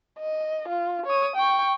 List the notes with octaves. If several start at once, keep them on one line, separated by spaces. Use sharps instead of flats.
D#5
F4
C#5 D#6
G5 C#6